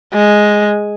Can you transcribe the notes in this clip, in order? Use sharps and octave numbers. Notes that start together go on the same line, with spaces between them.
G#3